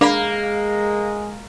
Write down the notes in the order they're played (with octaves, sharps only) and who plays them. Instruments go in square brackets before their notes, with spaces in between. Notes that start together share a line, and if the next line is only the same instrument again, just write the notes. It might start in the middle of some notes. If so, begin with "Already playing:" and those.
[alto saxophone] G#3 [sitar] A#3 [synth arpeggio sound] D4 F5 B5